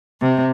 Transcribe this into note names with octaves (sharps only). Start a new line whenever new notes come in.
C3